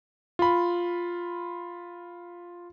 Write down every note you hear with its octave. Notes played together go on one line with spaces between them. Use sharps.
F4 B5